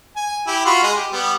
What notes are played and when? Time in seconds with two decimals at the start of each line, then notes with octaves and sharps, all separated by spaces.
0.16 G#5
0.47 E4 G4
0.65 F4 F#4 B5
0.83 G#3 D#5
0.95 G4
1.12 G3 B3